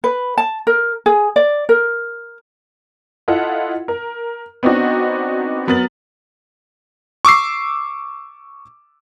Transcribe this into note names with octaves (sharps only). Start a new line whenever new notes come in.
B4
A5
A#4
G#4
D5
A#4
E4 F4 A4 D#5 F#5
A#4
B3 C4 D4 D#4 F#4
F#3 B3 A#4 A6 F#7
C#6 D6 E6 C7